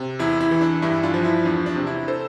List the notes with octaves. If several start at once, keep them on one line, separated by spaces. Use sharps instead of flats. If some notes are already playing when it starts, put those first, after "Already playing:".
Already playing: C3
E2 E4
E4
E3
D4
G2 E4
D4 F4
F3
E4
E2 D4
D4
C3
E4
A4 C5